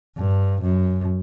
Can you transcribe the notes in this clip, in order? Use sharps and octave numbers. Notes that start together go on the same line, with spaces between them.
G2
F#2